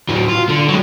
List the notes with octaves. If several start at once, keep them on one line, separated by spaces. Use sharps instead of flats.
A2 F#3
F4
D3
F#3 G#3